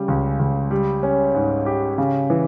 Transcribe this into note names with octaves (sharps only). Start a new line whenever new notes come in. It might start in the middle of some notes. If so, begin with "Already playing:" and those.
Already playing: C#3 G3
C#2
C#2
G3
C#4
G#2
G4
C#3
E3